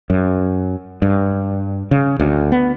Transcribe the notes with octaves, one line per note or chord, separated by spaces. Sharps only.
F#2
G2
C#3
D2
B3